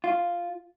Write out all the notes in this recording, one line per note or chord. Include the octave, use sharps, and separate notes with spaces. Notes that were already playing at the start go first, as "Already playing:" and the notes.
F4